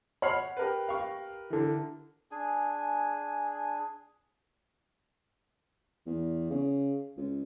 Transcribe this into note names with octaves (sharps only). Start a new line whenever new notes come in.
C#5 F#5 B5 F6 C7
G4 A#4 B4
F5 C#6
D3 E3
D4 G#4 G#5
E2
C#3
C#2